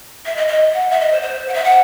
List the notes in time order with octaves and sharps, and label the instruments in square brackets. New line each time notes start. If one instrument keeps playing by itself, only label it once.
[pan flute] E5
D#5
D#5
F#5
E5
D#5
C5
C5
F#5
E5
F#5